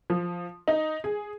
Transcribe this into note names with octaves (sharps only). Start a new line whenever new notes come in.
F3
D#4
G#4